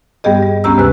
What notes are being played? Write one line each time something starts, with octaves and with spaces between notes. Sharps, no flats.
G2 G3 B3 G4 G#4 D#5
G3
D2 B3 C#4 G4 A#5 E6
F#2 C3 G#3 B4 F#6